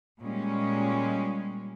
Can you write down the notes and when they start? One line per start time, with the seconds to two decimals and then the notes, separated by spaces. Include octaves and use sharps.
0.20 A#2 G3 G#3 C#4